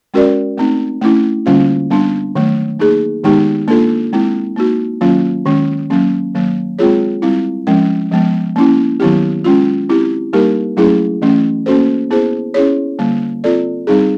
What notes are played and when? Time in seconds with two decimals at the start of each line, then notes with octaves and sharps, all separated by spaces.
0.14 G#3 C#4 F#4 A#4 D5
0.57 A3 C4 D#4
1.01 A3 C#4 E4
1.46 D3 G3 A#3 C#4 F4
1.90 G3 B3 D4
2.35 D#3 F#3 A3
2.79 A#3 D#4 G#4
3.24 D#3 G#3 B3 D#4 G4
3.68 A#3 D4 F4 A4
4.13 G#3 C4 E4
4.56 A#3 D#4 F#4
5.01 D#3 F#3 A#3 C#4 F4
5.45 D#3 G#3 C#4
5.90 F#3 A#3 C#4
6.35 D#3 F#3 A#3
6.79 G#3 C4 F4 G#4 C#5
7.22 G3 C4 E4
7.67 F3 G#3 C#4
8.11 F3 G#3 B3
8.56 A#3 C#4 E4
9.00 D#3 F#3 B3 E4 G4
9.44 G#3 C#4 F4
9.89 C4 E4 G4
10.33 G3 A#3 D#4 G4 A#4
10.77 F#3 A3 C#4 E4 G#4
11.22 E3 A3 C#4
11.66 A#3 C#4 F#4 A4 C5
12.11 B3 E4 G#4 C5
12.54 C#4 E4 G#4 C#5
12.99 D3 G3 A#3
13.44 C4 F4 A4 D5
13.87 G3 C4 D#4 G#4